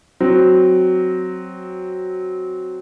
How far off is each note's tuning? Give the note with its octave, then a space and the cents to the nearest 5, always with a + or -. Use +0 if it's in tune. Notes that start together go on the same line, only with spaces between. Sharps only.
F#3 +0 C4 +0